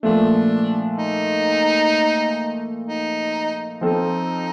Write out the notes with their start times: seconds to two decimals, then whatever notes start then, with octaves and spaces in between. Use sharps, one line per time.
0.02 A#2 F3 A3 D4
0.98 D#4
2.86 D#4
3.81 F3 C4 D#4 F4 A4